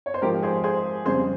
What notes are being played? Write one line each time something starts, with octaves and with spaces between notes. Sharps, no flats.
C#5
C5
G#2 F3 G4 A#4
G#4 C5
G#4 C5
F2 C#3 G3 G#4 C5